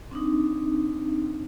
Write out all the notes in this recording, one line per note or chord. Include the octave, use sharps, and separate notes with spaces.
C4 D4 D#4